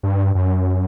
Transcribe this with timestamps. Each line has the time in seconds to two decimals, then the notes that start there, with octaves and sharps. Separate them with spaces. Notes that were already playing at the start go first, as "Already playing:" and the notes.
0.03 G2
0.35 F#2